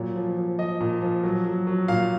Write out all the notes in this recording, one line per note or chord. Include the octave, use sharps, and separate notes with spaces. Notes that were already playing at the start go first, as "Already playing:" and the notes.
Already playing: A#2 F#3 C#5
F3
F3
F3 D#5
A#2
F3
F#3
F#3
F#3
A#2 F5